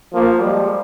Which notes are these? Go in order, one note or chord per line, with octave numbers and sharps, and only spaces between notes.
F3 A#3
G3 G#3